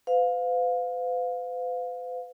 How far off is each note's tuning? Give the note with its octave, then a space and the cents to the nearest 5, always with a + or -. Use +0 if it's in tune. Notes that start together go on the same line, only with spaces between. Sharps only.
B4 +45 F5 +20